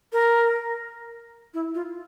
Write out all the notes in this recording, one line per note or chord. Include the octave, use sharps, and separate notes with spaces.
A#4
E4
F4